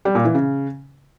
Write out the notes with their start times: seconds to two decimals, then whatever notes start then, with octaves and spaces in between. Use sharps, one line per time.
0.05 G3
0.15 A#2
0.25 E3
0.35 C#3